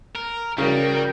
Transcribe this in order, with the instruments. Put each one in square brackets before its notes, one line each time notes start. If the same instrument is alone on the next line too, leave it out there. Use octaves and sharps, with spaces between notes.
[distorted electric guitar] A#4
[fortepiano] C#3 [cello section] F3 F#4 A#4 [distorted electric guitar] G3